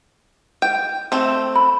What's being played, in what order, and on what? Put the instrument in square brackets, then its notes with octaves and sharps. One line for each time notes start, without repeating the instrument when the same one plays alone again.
[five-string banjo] G5
A3 C4
[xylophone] B5